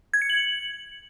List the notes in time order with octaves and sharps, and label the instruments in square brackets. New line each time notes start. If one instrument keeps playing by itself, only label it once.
[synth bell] G#6
C#7
F#7